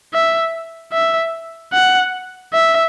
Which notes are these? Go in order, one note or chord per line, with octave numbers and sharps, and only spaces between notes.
E5
E5
F#5
E5